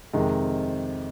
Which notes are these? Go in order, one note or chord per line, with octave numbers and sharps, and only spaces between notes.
F2 C3 D#3 G#3